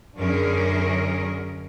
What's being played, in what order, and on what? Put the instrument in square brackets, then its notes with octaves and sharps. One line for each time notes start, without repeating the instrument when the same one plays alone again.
[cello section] F#2 D3 C#4 G#4 A#4